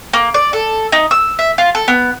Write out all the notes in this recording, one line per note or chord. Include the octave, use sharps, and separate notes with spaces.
A#3
D5
A4
D#4
E6
E5
F4
A4
B3